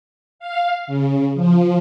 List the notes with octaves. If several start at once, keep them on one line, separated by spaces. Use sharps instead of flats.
F5
C#3
F3